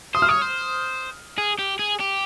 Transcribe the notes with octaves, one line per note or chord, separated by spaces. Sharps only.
C5 D#6
F6
C#5 D#6
C5
G#4
G4
G#4
G4